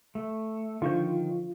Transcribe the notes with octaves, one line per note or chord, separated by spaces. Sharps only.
A3
D3 D#3 F3 F4 C#6 G6